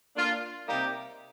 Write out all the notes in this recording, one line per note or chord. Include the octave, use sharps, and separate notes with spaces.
A#3 D4 F4
C3 G3 A#3 D#4 G4